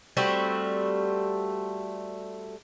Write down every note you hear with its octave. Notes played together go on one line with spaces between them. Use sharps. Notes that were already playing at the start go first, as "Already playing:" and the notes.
G3 A3 C4 F#4